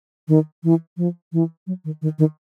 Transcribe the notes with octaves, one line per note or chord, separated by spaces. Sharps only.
D#3
E3
F3
E3
F#3
D#3
D#3
D#3